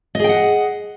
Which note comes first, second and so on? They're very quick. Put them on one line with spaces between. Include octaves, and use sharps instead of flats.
D#5 G#4 G5 F#5